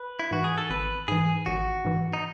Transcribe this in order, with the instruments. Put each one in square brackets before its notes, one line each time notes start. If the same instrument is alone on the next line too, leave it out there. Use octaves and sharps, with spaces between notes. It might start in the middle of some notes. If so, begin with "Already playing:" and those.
Already playing: [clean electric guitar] B4
E4
[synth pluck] G#2 E3 [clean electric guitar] F#4
[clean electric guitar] G#4
A4
[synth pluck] G#1 [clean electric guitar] B4
[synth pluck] G#2 E3 [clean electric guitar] G#4
[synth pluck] G#1 [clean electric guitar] F#4
[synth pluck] G#2 E3
[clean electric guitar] D#4